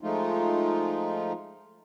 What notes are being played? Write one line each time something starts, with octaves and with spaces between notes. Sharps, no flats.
F3 G#3 A3 D#4 F4